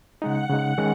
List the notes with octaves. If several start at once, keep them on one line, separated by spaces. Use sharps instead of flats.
C#3 G#3 D#4 F#5
C#3 G#3 D#4
D#3 G#3 C#4